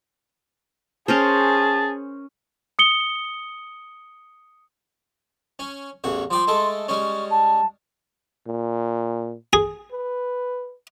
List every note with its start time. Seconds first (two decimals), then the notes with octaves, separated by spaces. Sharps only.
1.08 C#4 G#4 A#4 C5 A5
2.79 D#6 C#7 G7
5.59 C#4
6.04 A1 E2 F#4
6.31 F3 D5 G5 C6
6.47 G#3 A3 A4
6.88 G3 G#3 C#4 C#6
7.30 A5
8.47 A#2
9.53 G#4
9.92 B4